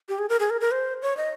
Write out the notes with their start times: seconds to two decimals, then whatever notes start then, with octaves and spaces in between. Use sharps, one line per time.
0.09 G4
0.19 G#4
0.29 A#4
0.40 G#4
0.50 A#4
0.61 A#4
0.71 C5
1.02 C#5
1.17 D#5